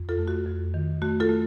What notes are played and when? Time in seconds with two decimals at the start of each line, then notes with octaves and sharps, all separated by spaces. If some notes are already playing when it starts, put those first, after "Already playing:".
Already playing: F2
0.09 F4 A4
0.19 A3
0.28 F#4
0.46 F2
0.74 D#3
1.02 A3 F#4
1.20 F4 A4
1.29 A3